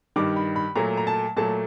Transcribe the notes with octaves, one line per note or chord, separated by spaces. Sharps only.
G2 D#3 G3 D6
B5
B5
A#2 F#3 A3 A#5
A#5
A5
A#2 F#3 A3 A5